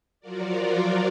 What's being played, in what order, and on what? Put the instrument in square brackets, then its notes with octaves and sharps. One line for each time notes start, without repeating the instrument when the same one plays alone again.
[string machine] F3 F#3 F4 F#4 A#4 D5